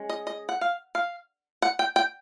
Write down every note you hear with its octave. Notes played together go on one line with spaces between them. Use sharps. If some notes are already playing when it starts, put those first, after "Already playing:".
Already playing: G#3 C#4
D#5
D#5
F#5
F5
F5
F#5
G5
G5